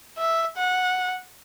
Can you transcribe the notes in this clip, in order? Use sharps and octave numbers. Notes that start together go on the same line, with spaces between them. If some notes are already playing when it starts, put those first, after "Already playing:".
E5
F#5